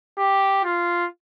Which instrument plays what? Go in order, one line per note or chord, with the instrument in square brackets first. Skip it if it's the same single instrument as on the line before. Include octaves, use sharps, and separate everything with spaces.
[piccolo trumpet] G4
F4